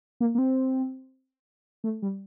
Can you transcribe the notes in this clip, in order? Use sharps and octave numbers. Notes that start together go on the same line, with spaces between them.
A#3
A#3
C4
A3
G3